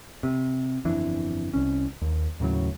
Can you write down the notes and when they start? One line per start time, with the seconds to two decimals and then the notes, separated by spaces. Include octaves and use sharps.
0.23 C3
0.85 G1 F2 E3 D4
1.53 C2 C#4
2.01 D#2
2.40 D#2 A2 C#3 F#3